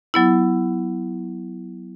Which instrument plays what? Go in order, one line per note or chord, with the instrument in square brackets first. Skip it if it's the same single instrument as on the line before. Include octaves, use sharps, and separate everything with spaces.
[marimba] F#3 B3 E4